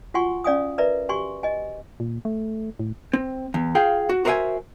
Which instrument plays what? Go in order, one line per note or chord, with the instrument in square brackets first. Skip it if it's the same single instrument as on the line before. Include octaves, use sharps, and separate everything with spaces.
[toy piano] F4 F#4 F#5 G#5 C6 C#6
C#4 D5 F5 G#5 D#6
A#4 B4 D5 E5 A#5
F#4 G4 G#5 C6 C#6
D#5 G#5
[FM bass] A#2
A3
A2
[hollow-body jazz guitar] C4
E2
F4 G#4 F5 G5
F#4
F#4 A#4 C5 D5 E5 G#5